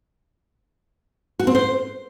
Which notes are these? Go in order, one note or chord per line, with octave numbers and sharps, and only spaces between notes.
F#4
C4
C5